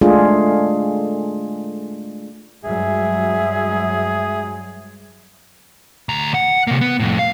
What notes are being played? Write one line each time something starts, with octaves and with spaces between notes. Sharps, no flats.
G#3 A3 D4 F4 G#4
G2 F#3 G#3 G#4 E5
D2 A#5
F#5
C3 A#3
B3
F2 A2
F5